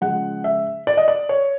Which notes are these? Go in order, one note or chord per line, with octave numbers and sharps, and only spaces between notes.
C#3 F3 G#3 F#5
E5
D5
D#5
D5
C#5